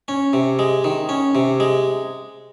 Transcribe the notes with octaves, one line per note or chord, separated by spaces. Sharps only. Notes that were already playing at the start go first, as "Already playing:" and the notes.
C#4
C3
G#3
D#3
C#4
C3
G#3